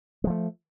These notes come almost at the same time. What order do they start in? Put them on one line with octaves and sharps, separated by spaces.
G#3 F3 A3